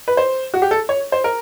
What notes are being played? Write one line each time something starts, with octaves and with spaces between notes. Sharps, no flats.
B4
C5
F#4
G4
A4
C#5
C5
A#4